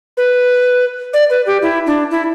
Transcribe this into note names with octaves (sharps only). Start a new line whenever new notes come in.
B4
D5
B4
G4
E4
D4
E4